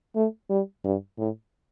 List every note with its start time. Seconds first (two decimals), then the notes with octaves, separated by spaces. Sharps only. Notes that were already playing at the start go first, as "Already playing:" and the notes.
0.16 A3
0.50 G3
0.85 G2
1.19 A2